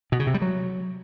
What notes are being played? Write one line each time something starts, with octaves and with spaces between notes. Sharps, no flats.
B2
C#3
C3
G3
F#3